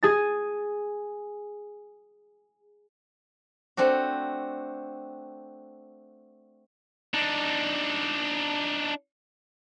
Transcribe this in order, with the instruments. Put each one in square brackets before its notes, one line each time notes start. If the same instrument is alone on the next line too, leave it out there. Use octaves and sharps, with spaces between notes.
[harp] G#4 A6
[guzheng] A3 C4 D4 F#4
[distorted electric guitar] D4 D#4